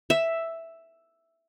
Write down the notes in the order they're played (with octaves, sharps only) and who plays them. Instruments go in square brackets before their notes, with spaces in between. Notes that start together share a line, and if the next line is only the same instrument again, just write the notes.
[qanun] E5